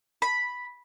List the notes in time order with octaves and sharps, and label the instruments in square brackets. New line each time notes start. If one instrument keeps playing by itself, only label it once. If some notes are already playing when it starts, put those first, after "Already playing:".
[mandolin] B5